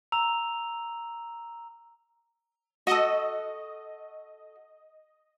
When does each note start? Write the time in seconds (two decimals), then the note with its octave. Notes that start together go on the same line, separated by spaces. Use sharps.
0.12 A#5 E6 F7
2.87 F#4 A4 D#5